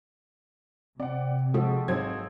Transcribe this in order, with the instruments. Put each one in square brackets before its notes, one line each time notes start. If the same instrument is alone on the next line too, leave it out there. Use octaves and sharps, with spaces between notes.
[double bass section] C3 [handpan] C4 [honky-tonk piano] D5 F#5
[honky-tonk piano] F3 [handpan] G#3 F#4 A4
[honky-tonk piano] G#1 C4 G#6 [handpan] F#3